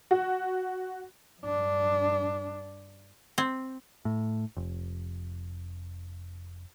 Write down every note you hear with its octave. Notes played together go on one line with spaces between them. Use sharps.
F#4
G2 D4
C4
A2
F1